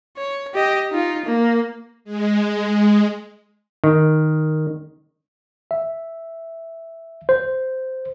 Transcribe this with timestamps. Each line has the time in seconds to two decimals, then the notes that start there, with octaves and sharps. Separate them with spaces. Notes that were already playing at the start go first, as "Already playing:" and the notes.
0.17 C#5
0.54 G4 D#5
0.90 D#4 F4
1.25 A#3
2.04 G#3
3.84 D#3
5.71 E5
7.29 C5